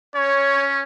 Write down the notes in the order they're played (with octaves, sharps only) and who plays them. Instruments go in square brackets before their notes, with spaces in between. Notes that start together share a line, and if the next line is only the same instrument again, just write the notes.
[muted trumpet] C#4 [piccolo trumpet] C#5